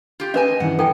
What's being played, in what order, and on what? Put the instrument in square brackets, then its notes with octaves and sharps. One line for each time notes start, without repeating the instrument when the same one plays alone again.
[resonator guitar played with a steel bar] F4 G4
[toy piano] C#4 B4 [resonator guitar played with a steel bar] D#5 G#5
[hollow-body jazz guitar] G2 D#3 E3 [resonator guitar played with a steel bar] F#5
[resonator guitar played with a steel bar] A#2 [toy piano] A4 G5 G#5